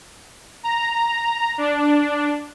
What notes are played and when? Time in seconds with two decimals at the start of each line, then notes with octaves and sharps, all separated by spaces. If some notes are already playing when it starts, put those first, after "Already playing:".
0.63 A#5
1.58 D4